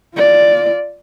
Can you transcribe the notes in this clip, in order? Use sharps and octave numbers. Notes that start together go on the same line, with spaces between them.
F4 D5